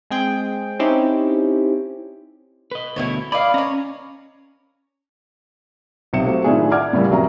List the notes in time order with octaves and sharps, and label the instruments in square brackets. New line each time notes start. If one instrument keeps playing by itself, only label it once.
[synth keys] G#3 C4 G#4 G5
C4 C#4 D#4 E4 G4
[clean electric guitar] B4 D#5
[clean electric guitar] D2 B2 [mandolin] E4 F#4 C#5
[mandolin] D5 D#5 F5 [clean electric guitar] B5
[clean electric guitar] C#4 [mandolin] C#5 A#5
[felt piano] B1 C3 C#7 E7
F#3 A3 C4
A2 D#3 D4 E4 F4 G#4
D5 E5 F#5 D6 F6 G#6
A2 C#3 G3 A#3
F1 F#3 E5 A#5